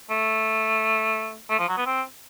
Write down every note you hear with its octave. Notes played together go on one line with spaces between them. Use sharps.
A3
A3
F3
F#3
B3
C4